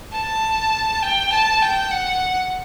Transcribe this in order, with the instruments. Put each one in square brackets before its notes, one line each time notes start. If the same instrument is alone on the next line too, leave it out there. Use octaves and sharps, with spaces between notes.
[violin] A5
G5
A5
G5
F#5